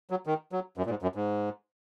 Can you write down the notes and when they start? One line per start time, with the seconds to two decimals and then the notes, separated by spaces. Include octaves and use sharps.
0.10 F#3
0.26 D#3
0.52 F#3
0.78 F#2
0.86 A#2
0.90 G#2
1.02 F#2
1.15 G#2